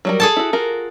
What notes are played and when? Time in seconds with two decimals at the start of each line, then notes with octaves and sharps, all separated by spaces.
0.05 F#3 G3 A#4
0.20 G#4 A4 A5
0.36 E4 F#4
0.53 F4 F#4 A#4